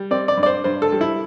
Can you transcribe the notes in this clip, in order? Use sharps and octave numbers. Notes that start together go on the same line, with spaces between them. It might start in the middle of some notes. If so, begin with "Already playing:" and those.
Already playing: G3
C4 D5
D5
G2
D5
C5
G2 C5
A4
G3
E4